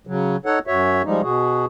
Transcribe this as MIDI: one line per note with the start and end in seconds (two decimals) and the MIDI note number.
0.07 0.36 49
0.07 0.36 54
0.46 0.59 63
0.46 0.59 69
0.46 0.59 73
0.46 0.59 78
0.67 1.02 42
0.67 1.02 66
0.67 1.02 73
0.67 1.02 76
1.05 1.22 53
1.05 1.22 55
1.05 1.22 56
1.05 1.22 63
1.22 1.66 47
1.22 1.66 66
1.22 1.66 68